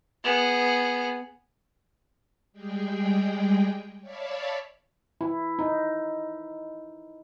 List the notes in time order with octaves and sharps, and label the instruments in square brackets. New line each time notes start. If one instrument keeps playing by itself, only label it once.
[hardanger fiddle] B3 G#4
[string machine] G3 G#3 G#4 G5
C#5 D5 E5 F5 A5 B5
[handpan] E4
D#4